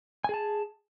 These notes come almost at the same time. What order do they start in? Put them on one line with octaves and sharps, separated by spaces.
G#5 G#4 A5